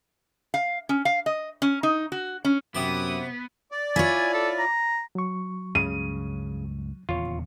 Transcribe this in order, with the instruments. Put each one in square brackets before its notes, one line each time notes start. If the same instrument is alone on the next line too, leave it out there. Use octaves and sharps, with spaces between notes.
[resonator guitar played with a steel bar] F5
C#4
F5
D#5
C#4
D#4
F#4
C#4
[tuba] F#2 [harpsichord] C3 G4 A5 [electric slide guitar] B3 [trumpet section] E4 D6 D#6
[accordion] D5
[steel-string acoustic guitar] E4 F4 C#5 [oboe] G#5
[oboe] A4
A#5
[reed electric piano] F#3 C#6
[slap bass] C#2 G2 [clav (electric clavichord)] C#3 [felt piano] D#7
[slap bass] D#1 E2 C#3 [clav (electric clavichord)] F4 C#5